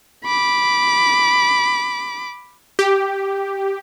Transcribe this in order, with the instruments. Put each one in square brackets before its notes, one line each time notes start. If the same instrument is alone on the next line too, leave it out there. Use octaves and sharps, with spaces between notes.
[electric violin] B5 D6
[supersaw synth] G4